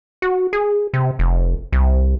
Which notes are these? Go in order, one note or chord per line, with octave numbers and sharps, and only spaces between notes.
F#4
G#4
C3
F1
C2